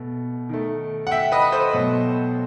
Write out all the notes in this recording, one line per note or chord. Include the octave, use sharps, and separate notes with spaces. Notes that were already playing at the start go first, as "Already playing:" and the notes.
Already playing: B2 A3
D#3 A3
F#5
E5 G5
B4 D#5
A4 C5
B2 F#3 A3